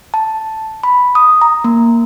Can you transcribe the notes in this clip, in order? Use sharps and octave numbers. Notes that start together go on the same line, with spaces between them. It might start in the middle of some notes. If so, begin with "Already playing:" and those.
A5
B5
D#6
A#5
A#3